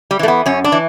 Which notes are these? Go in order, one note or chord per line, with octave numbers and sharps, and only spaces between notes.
G3
E3 A3
B3
F#2 C#4
D4
E3